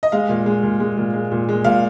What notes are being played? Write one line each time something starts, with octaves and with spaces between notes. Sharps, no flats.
D#5
G#3 F5
A#2
G#3
A#2
G#3
A#2
G#3
A#2
G#3
A#2 F5